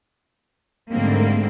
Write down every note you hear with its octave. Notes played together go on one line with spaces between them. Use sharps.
G#2 D3 G3 A3 A#3 C4